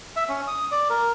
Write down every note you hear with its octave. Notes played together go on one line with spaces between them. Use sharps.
E5
C#4
D#6
D5
A#4